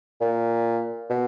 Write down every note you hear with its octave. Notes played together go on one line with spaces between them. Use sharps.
A#2
B2